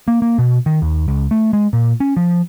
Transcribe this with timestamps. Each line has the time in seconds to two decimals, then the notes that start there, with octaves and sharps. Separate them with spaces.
0.08 A#3
0.22 A#3
0.38 B2
0.66 D#3
0.82 D#2
1.08 C#2
1.31 A3
1.53 G#3
1.73 A#2
2.00 C#4
2.17 F3